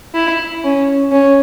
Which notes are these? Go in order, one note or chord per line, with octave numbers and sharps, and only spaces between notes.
E4
C#4
C#4